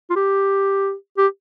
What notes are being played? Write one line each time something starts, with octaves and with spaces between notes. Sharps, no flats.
F4
G4
G4